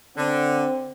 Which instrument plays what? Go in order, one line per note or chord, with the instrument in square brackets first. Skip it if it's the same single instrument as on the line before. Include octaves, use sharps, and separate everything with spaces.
[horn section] D3 [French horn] C4